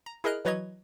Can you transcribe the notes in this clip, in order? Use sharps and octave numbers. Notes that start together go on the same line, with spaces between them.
A#5
E4 G#4 A#4 D#5 F6 F#6
E3 F#3 B4 C#5 D#5 G#6